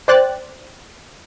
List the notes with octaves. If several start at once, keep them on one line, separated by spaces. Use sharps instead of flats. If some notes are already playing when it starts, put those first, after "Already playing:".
C5 D5 G5 F#6 A6